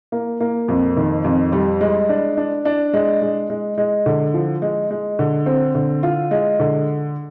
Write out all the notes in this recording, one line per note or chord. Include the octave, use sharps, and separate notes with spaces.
A#3
A#3
F2
D#3
F2
G3
G#3
D4
D4
D4
G#3
G#3
G#3
G#3
D3
F3
G#3
G#3
D3
C4
D3
F4
G#3
D3